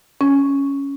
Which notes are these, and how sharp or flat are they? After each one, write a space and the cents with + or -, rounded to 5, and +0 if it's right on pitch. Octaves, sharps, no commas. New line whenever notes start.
C#4 +5